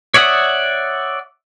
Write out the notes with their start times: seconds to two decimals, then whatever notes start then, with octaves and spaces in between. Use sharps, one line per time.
0.14 C#5 D5 E5 F#5 D#6